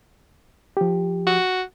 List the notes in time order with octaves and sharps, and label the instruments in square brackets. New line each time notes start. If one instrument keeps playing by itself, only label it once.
[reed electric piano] F3 G4
[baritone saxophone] F#4